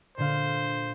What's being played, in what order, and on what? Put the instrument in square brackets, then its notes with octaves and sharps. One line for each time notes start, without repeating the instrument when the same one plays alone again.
[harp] A#2 D3 F5 [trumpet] C5